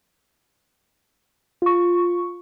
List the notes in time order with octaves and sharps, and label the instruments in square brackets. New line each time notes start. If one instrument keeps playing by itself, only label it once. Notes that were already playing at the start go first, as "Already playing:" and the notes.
[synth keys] F4 C#6